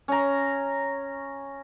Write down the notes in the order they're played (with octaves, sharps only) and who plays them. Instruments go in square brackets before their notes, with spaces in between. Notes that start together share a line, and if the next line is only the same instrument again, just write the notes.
[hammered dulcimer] C#4 A#5